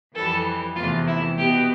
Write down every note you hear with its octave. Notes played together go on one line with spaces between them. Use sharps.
F2 E3 G3 A4
E2 C3 E3 A3 F4
E4
B2 B3 G4